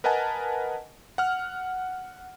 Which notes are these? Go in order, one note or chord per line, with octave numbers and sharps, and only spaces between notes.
A#4 B4 D#5 F#5 G#5 A5
F#5 F6